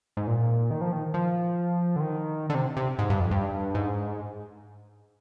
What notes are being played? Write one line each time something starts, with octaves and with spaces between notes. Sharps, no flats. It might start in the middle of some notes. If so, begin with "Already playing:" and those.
G#2
A#2
D#3
F3
D#3
F3
D3
D#3
D3
C3
C3
G#2
G2
F2
G2
G#2